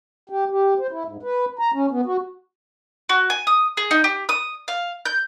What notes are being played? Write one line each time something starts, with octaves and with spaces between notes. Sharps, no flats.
G4
G4
C5
E4
G#2
B4
A#5
C#4
B3
F#4
F#4
G#5
D#6
G#4
D#4
G4
D#6
F5
G6